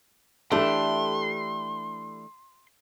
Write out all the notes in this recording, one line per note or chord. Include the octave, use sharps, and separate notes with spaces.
E3 A3 D4 G4 A4 C6